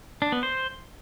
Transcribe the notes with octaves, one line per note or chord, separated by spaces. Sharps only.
D4
B3
C5